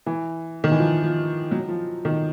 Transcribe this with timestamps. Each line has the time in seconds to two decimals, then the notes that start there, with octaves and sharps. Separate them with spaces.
0.06 E3
0.64 D#3
0.72 E3
0.79 F3
1.03 F3
1.51 F#3
1.69 F3
2.05 D#3